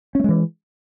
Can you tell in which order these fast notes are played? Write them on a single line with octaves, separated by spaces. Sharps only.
C#4 A3 G#3 E3